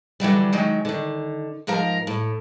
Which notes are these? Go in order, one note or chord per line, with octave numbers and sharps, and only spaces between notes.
D3 E3 F#3 G3
D#3 F#3 G#3
D3 D#3
G#2 F3 A#4 F5 A#5
A2